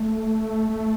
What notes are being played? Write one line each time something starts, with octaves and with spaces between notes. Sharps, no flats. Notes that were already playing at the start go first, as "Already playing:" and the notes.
Already playing: A3
A3